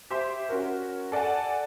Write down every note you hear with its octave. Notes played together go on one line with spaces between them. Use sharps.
G4 C5 E5
C#4 F#4 A#4
A4 D5 F#5 G#5 A5